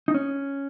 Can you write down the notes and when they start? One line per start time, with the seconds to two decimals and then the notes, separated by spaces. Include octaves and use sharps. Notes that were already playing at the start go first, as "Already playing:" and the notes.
0.08 D#4
0.14 C#4